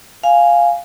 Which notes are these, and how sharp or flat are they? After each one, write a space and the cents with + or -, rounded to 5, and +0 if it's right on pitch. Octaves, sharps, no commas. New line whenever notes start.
F5 +0 G#5 +0